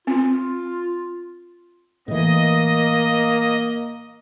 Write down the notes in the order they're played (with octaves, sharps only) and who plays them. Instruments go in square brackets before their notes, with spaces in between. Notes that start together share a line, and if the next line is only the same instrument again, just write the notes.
[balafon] C4 [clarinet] F4
[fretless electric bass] A2 E3 [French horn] A#3 [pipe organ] D#5